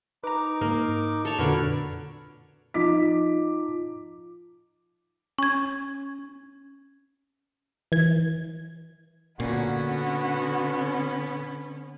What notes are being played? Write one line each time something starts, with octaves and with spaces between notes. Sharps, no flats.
D#4 B4 A#5 D6
G#2 A#3
A4 C#5
F2 A#2 D3 F#4 A#4 B4 C#5 D5
F3 D#4 D6 B6
C#4 C#6 G#6
E3 G#6
A#2 D3 B3 C#4 F#4